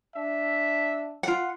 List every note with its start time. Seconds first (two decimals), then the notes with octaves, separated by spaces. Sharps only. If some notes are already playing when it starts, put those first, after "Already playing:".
0.16 D4 E5
1.23 F4 F#5